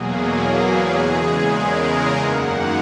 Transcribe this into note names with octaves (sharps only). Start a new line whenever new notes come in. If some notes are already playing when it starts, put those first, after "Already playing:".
Already playing: E2 B2 F#3 A#3 G#4
E2 C#3 G#3 G#4
A#4
F#2 D#3 A#3 F#5